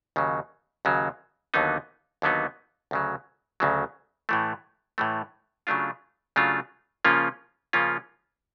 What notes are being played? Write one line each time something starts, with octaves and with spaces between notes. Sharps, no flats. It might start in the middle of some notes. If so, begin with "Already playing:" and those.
D#2 C#3 F#3
D#2 C#3 F#3
D#2 D3 F#3 B3 D#4
D#2 D3 F#3 B3 D#4
D2 C#3 F#3
D2 C#3 F#3
A2 E3 A3
A2 E3 A3
C#3 F#3 A3 D4 F4
C#3 F#3 A3 D4 F4
C#3 F3 A#3 C#4 F4
C#3 F3 A#3 C#4 F4